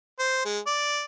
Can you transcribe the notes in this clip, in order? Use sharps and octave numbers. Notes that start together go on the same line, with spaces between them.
C5
G#3
D5